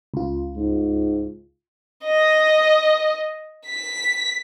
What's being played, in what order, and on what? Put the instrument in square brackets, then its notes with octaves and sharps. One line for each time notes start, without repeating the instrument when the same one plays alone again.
[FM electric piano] C#2 F4
[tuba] G#2
[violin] D#5
B6